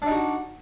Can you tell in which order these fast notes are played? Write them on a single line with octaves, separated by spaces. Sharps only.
D4 D#4 F#4